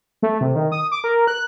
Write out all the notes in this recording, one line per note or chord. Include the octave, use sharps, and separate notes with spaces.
A3
C3
D#3
D#6
D6
A#4
F#6